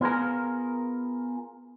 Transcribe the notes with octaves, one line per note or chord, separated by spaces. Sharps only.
B3 F4 G#4 A#4